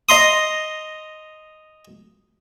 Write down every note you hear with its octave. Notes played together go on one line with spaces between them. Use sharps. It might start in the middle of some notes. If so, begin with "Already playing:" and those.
D#5 A#5 C6 D#6